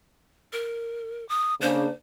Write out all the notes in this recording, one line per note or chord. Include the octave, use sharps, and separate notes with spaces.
A#4
D#6
C#3 A#3 D4 C5